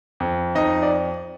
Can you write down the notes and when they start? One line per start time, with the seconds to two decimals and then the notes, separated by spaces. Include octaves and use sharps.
0.20 F2
0.55 F2 D#4 D#5
0.83 D5